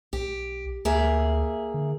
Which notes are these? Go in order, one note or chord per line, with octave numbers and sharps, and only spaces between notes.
B1 G4
D2 A#3 G#4 E5
D3